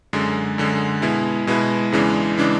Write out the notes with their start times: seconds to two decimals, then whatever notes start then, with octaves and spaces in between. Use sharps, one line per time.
0.13 F#2 D3 G#3
0.58 F#2 D3 G#3
1.02 B2 G#3 B3 E4
1.47 B2 G#3 B3 E4
1.92 E2 C#3 E3 G#3 D4
2.38 C#3 E3 G#3 D4